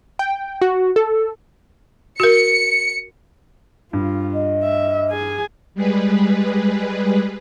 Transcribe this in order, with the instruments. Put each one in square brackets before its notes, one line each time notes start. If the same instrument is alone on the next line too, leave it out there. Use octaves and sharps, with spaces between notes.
[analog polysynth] G5
F#4
A4
[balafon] F#4 A#4 [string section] C#7
[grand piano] G2 [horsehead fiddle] F4
[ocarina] D#5
[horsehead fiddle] E5
G#4 G#5
[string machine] G3 G#3 G#4 B4